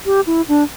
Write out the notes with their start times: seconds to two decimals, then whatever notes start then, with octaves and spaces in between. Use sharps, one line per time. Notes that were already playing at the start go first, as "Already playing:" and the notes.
0.06 G4
0.27 E4
0.48 D4